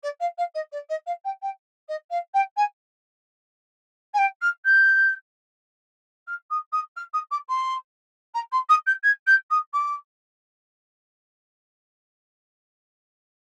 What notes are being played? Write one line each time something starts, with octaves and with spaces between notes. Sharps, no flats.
D5
F5
F5
D#5
D5
D#5
F5
G5
G5
D#5
F5
G5
G#5
G#5
G5
F6
G6
F6
D#6
D#6
F6
D#6
D6
C6
A#5
C6
D#6
G6
G#6
G6
D#6
D6